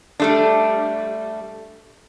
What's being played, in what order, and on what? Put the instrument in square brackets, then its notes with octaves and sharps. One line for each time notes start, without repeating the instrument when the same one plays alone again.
[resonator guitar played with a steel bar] G3 A3 D4